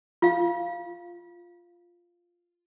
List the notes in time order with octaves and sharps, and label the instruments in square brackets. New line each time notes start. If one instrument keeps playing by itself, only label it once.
[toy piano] F4 F5